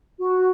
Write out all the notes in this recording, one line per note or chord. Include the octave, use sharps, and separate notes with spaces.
F#4